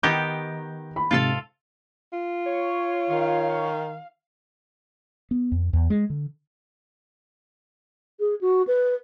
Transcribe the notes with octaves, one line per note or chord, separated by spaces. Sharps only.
D#3 B3 G4 G6 A#6
B5
G#2 C3 F4 A4 F5
F4
C#5
D#3 F5
B3
F2
E2
G#3
D3
G#4
F#4
B4